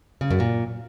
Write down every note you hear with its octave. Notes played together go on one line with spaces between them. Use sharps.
C#3
F#2
A#2